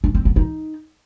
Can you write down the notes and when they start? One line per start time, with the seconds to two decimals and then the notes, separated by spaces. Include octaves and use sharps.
0.04 D4
0.15 C4
0.25 B3
0.36 D#4